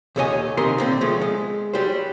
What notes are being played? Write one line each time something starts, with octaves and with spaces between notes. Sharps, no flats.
D#2 A#2 A4 C#5 D#5 G#5
D#2 C3 D#3 A#4 D#5 C6
A#2 D3 C4
B2 F3 G#3 A3
G#3
F#3 G3 C5